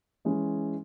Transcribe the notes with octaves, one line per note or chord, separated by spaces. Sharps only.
E3 G#3 C#4